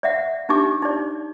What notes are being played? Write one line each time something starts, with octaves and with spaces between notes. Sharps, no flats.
D5 E5 F#5
D4 D#4 G4 D6
D#4 D5